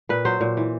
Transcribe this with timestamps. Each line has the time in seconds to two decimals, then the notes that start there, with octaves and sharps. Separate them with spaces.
0.09 A#2 B4
0.25 F#3 C5
0.41 A#2
0.57 E3